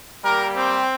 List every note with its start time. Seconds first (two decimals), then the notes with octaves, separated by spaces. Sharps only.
0.24 G3 A#3 G4 A#4
0.55 C4 C5